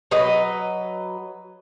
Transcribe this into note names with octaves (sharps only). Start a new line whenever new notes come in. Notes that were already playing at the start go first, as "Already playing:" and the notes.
F#3 B4 D#5